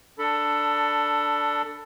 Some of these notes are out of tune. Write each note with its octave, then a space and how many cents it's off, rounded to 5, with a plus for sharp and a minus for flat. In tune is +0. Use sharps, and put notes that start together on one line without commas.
D4 +0 A4 +15 B5 +0